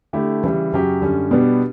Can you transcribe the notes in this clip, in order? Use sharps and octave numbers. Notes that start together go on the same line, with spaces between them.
D3 A3 E4 G4
C#3 E3 G3
F#2 C#3 F#3 C#4 G4
F#2 D3 G3 C#4
B2 G3 B3 D4